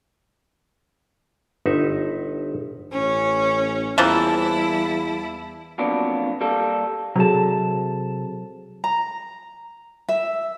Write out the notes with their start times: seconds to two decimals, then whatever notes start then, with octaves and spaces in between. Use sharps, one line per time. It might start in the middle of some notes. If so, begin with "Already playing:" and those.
1.66 G1 D#4 E5 F#5
2.93 A1 C#4
3.98 E2 E3 F3 G3 A#3 E4 A5
5.78 F2 B2 F#3 A#3 B3 D4
6.41 G3 A#3 A4
7.16 C3 F#3 F#4 G#4 A4 A5
8.84 A#5
10.09 E5